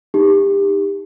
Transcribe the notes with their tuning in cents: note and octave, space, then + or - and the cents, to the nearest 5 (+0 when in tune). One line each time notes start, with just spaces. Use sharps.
D#4 +0 G4 +25